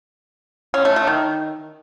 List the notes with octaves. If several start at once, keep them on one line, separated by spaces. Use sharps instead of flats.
C#4
A3
A3
D#3